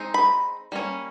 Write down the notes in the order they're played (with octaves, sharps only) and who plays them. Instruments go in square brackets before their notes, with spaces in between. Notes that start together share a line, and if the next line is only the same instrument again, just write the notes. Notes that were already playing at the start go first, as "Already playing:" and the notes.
Already playing: [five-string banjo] G#3 C4 D#4
B5
G3 A#3 C#4